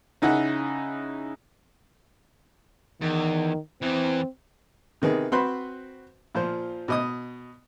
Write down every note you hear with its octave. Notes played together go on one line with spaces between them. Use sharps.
C#3 D#4 E4 F#5
E2 D#3
E2 E3 C4
C3 D#3 B3 G#4
C4 F#4 B4 C5 B5 C6
A#2 F3 C5
B2 D#5 D#6